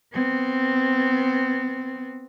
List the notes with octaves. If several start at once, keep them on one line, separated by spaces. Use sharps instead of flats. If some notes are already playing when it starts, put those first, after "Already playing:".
B3 C4